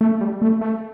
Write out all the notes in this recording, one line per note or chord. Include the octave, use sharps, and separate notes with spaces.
A3
G3
A3
A3